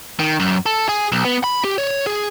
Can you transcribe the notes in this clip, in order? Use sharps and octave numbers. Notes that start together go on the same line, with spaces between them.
D#3
F#2
A4
G#4
B1
B3
B5
G4
C#5
G#4